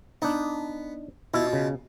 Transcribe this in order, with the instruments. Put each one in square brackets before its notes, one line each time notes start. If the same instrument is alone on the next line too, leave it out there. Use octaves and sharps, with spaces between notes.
[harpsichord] B3 [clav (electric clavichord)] D4 D#4
[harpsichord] B2 F4 [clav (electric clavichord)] E4
[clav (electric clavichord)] C#3